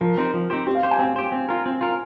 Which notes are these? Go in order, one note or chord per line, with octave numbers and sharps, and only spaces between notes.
F3 A#4
C4 D#4 G4 C5
F3
C4 D#4 G4 C5
C4 G4
F5
G4 C5
G#5
C4 G5
G4 C5
C4
F4 A#4
C4
F4 A#4